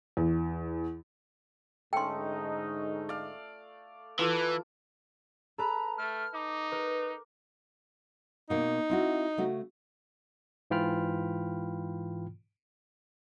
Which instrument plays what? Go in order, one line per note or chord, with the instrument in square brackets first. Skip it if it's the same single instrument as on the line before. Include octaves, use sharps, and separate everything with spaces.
[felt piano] E2
[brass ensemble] G#2 D3 D#4 [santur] A3 C#4 [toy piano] G5 C6
[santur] D5 F5
[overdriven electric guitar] E3 [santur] F4 A4 D6 [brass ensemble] B4
[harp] A4 B4 B5 [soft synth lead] A#5
[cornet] A3 [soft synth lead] F6
[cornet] D#4 [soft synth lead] D6
[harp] A#4 D6 [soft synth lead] B4
[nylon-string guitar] B2 A#3 [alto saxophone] D#4
[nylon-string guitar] C4 E4 F#4
C#3 A3 F#4
[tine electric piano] G#2 E3 F4 G5 B5 F6